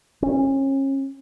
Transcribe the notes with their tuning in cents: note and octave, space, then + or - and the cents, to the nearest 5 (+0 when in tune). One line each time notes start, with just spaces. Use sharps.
C#4 -35